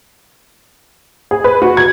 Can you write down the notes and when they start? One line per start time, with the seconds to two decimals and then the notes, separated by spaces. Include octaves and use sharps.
1.31 G#4
1.44 B4
1.62 F#4
1.77 G#6